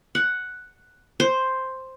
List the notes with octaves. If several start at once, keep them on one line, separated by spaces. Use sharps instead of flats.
F#5
C5